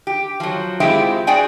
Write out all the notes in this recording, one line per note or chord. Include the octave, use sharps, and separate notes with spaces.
G4
F3 F#3
G#3 C4 E4 F4 G4
F#4 G#4 D5 G5 G#5